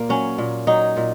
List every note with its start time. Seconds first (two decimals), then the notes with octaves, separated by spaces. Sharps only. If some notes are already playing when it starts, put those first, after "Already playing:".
Already playing: A#2 A#3
0.09 F#3 C#4
0.38 A#2
0.67 F#3 D#4
0.97 A#2